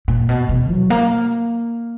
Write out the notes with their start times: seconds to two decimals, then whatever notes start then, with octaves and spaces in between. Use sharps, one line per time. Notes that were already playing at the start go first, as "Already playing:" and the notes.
0.08 A#2
0.29 B2
0.49 B2
0.70 F#3
0.90 A#3